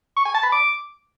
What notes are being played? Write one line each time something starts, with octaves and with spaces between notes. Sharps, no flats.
C#6
G#5
A5
B5
D6